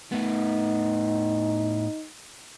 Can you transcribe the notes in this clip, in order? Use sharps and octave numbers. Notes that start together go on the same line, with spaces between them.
A2 B3 D#4